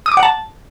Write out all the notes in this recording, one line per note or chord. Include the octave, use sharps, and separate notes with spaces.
D#6
D6
F#5
A5